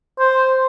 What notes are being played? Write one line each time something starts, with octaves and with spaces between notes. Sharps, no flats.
C5